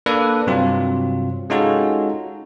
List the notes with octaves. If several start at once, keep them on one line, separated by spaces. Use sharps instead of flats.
A#3 D4 A4 B4
G2 C3 F#3 C4 F4
G#3 C#4 D#4 F4 F#4 A4